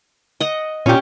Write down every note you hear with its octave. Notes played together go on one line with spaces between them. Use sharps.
D#5 F#5
A#2 C#4 G4